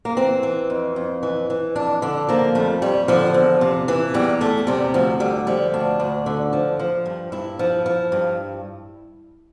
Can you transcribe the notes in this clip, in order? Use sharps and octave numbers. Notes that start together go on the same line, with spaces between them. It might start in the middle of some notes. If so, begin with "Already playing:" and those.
A#3
E3 C4
E3
F2
F2
E3
E3
F2 D4
D3 D4
F3 A#3
F2 A3
F2 G3
D3 F3
E2
C3
E3
E2 G3
E2 A3
C3 G3
D2 F3
D3 G3
F3 G3
D2 D4
D2
D3
F3
F3
G2
G2 E4
F3
F3
G2